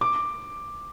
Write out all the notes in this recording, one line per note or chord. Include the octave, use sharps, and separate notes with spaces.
D6